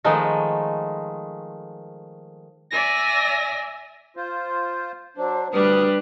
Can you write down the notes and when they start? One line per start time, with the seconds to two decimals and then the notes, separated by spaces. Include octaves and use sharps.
0.04 D#3 F3 G#3 A3
2.71 D5 E5 G#5 A#6
4.17 F4 C5
5.17 F#3 D4 C5
5.53 D2 G3 D4 B4 D#6 F6